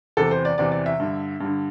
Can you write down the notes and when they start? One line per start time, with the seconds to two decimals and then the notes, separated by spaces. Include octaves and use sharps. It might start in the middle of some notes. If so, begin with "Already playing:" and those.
0.17 E2 C3 E3 A4
0.31 C5
0.45 D5
0.58 E2 C3 E3 D5
0.72 D5
0.86 E5
1.00 G2 D3
1.40 G2 D3